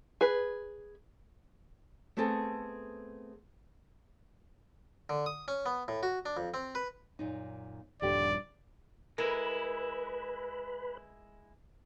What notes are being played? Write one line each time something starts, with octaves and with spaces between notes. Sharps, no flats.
G#4 B4
A3 B3 C4 G#4 A4
D3
D#6
C#4
B3
A2
F#4
D4
F2
C4
B4
F#2 A#2 D#4
D#1 G2 D3 G3 G4 D5
G#3 E4 A#4 B4 B5